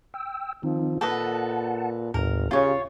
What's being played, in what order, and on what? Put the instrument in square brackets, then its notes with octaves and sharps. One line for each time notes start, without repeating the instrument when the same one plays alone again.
[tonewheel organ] G5 E6
[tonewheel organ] D#3 C4 D#4 [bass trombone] F3
[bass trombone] A#2 [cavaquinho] A4 B4 D#5 [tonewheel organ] F#5 A5
[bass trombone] G1 [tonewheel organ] D#2 A2 [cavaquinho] A#4
[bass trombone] C#3 [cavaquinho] F4 C#5 [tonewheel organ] G4